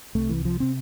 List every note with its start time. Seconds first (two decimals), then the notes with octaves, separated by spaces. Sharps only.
0.15 C2 C3 A3
0.29 E3
0.45 F3
0.60 C3 C4